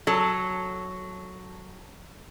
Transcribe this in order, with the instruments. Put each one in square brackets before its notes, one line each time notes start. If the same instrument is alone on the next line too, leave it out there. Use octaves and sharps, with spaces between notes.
[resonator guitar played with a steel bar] F#3 A4